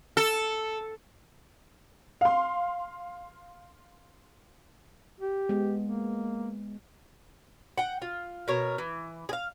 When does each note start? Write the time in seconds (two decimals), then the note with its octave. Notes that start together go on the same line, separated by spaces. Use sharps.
0.17 A4
2.21 F5 C6
5.20 G4
5.49 G#3 B3
5.82 A#3
7.78 F#5 G5
8.02 F4
8.48 B2 A#4 C#5
8.78 E3
9.29 G#4 F5